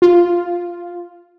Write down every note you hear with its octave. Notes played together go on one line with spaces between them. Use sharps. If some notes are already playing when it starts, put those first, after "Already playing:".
F4